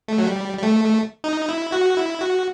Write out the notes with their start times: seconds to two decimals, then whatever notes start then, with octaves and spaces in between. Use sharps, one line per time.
0.08 A3
0.18 F#3
0.27 G3
0.58 G3
0.63 A3
1.24 D#4
1.49 E4
1.72 F#4
1.97 E4
2.21 F#4